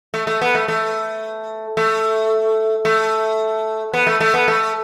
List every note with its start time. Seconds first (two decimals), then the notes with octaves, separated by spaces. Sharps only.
0.14 A3
0.27 A3
0.41 B3
0.55 A3
0.68 A3
1.77 A3
2.85 A3
3.94 B3
4.07 A3
4.21 A3
4.34 B3
4.48 A3